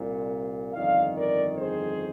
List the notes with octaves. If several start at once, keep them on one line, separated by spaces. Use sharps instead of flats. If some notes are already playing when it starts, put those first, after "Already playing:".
Already playing: C2 A#2
G1 F2 D#3 D5 F5
A#4 D5
G#4 C5